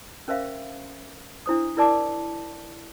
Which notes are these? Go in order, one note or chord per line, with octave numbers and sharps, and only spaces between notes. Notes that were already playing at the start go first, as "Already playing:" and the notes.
C#4 A#4 C5 E5 F5
D4 E4 C5 D#6
E4 A#4 D5 A5 D6